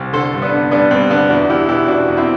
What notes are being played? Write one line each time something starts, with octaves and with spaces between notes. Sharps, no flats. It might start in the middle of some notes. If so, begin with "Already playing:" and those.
Already playing: C2
D3 A4 C5
G2
B3 D4
D3
G2 B3 D4
G2 C4
D3 B3 D4
E2 D4 F#4
E2 E4 G4
B2 E4 G4
B2 D4 F#4
E2
C4 E4